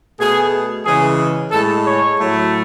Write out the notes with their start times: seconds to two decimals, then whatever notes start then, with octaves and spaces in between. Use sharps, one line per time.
0.19 B2 A3 G#4
0.85 C#3 E3 G#3 G#4
1.51 A2 G#3 A4
1.84 C#5
2.18 A2 F#3 A3